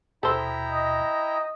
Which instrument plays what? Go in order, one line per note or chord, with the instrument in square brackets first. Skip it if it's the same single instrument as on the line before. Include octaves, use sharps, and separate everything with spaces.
[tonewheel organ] D#2 B2 [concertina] E4 G5 A#5 [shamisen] A4 C5
[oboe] D#5